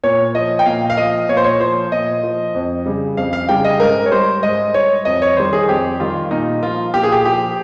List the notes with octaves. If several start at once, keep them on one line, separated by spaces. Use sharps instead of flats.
A#2 C#5
F3 D#5
G5
A#2 F5
F5
F3 D#5
A#2 C#5
C5
C#5
F3 C5
A#2 D#5
F3
F2
C#3 G3
F2 F5
F5
C#3 G3 G5
D#5
G#2 A#4
C#5
G3 C5
G#2 D#5
G3 C#5
F2 D#5
C#5
D#3 G3 C5
G#4
F2 G4
D#3 G3 F4
A#2 D#4
F3 F4
A#2 G4
G#4
G4
F3 G4